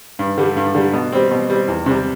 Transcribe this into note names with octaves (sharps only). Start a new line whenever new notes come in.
G2
D3 G3
G2
D3 G3
B2
G3 C4
B2
G3 C4
E2
C3 G3